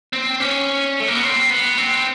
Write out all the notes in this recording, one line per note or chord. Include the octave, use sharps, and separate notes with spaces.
C4
C#4
A3
A#3
B3
C4
B3
C4